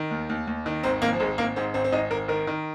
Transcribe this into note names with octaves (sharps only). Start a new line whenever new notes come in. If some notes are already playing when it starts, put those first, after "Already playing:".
Already playing: D#3
D#2
D#2
D#2
D#3
G#1 C4
G#1 A#3
F3
G#1 G#3
G#1 A#3
G#2 C4
G#1 C4
C4
G#1 D#4
G#1 A#4
D#3 A#4
D#3